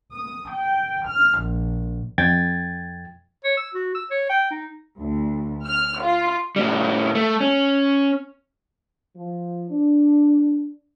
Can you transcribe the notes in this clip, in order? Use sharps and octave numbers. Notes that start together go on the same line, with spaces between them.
D#6
G5
F6
A#1
F2 G5 G#6 A6
C#5
E6
F#4
E6
C#5
G5
D#4
D2
F6
F4
A2 G3
A3
C#4
F3
D4